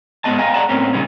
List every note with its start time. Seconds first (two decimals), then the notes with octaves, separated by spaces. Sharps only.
0.24 G#2 G#3 A#3 B3 D#5 A5
0.38 D#5 F5 G5 G#5 A#5
0.54 G#4 D5 F#5 A5 A#5
0.69 A2 A#3 C4 C#4
0.93 A#2 C#3 G3 B3 D#4